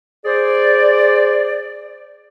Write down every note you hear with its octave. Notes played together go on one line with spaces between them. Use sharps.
G#4 C5 D5